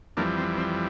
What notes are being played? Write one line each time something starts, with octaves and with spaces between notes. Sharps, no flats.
F2 E3 G3 A#3 D4
C4
C4